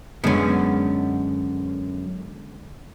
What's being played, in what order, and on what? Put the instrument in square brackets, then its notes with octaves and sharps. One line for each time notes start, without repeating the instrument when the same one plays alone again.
[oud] F#2 C#4 [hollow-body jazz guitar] D3 G#3 B3